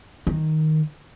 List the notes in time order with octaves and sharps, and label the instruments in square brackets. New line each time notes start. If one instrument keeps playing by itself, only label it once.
[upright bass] D#3